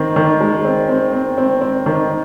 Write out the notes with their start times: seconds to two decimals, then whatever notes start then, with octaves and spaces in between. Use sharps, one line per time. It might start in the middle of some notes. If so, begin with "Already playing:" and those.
Already playing: D#3 C4
0.16 D#3
0.40 G#3
0.64 C4
0.89 C4
1.13 C4
1.38 C4
1.61 C4
1.86 D#3